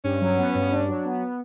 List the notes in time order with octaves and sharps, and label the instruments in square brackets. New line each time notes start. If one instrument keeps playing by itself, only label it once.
[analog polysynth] G2 [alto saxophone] C#4
[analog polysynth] F#3
B3
G2
D4
F#3
B3